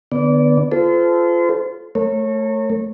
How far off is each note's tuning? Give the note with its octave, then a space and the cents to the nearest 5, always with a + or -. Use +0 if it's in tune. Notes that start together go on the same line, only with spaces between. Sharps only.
D3 +25 B3 +0 D5 -25
F4 -10 A4 -25 C5 -35
A3 +0 A#4 -45 C#5 -20